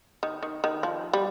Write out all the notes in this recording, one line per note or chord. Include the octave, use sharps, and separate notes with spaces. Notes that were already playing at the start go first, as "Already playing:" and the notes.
D#3
D#3
D#3
F3
G3